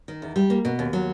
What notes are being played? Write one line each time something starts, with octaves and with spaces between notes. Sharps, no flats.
D#3
E2
G3
A#3
B2
D#2
F#3